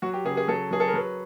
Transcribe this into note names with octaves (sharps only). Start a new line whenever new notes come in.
F#3 F#4
G4
C#3 G#4
G#4
F#3 A4
F#3 G#4
A4
A#4
F#3 B4